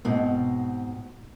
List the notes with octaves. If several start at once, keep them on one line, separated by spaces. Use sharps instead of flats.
G#2 B2 C4